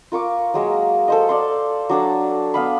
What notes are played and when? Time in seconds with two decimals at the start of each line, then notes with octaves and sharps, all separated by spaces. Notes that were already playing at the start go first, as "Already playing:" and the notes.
0.12 F4 A#4 C#6 D6
0.54 F#3 G#3 A#3
1.08 A4 C5 D#5
1.29 D5 F5 C6
1.89 F#3 D4 A4
2.54 B3 F5 B5